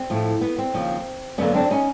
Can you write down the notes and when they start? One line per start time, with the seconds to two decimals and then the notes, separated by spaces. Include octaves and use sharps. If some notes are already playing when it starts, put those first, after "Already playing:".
Already playing: C4
0.10 A2 F3 A3
0.41 B3
0.58 C4
0.74 D#2 C#3 F3 A#3
1.38 F#2 D3 F#3 A#3 B3 C#4
1.55 C4 D4
1.71 C#4 D#4